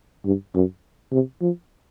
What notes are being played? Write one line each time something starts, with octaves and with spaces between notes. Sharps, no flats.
G2
F#2
C3
F3